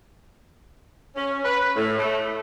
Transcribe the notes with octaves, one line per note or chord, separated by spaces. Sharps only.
C#4
B4
A2
A3